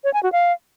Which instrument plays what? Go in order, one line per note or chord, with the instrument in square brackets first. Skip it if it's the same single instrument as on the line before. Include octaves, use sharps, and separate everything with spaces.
[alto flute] C#5
G#5
F#4
F5